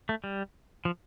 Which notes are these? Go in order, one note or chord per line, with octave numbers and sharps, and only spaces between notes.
A3
G3
F3